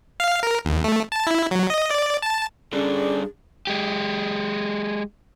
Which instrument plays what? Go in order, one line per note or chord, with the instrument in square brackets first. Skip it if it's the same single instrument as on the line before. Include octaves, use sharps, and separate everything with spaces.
[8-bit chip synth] F5
A#4
D#2
A3
A5
E4
F#3
D#5
D5
A5
[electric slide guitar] G3 D4 A4 [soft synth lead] C#4 [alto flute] G#4 [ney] D5
[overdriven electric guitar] G#3 G4